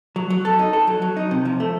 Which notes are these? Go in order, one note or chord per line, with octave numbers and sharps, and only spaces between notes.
F#3
F#3
A4
D#4
A4
F#3
F#3
D#4
C3
F3
A3